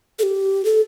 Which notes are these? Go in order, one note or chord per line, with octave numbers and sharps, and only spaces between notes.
A4
G4
A4